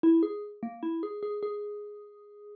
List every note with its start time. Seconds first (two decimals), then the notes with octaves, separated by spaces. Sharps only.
0.03 E4
0.23 G#4
0.63 A#3
0.83 E4
1.03 G#4
1.23 G#4
1.43 G#4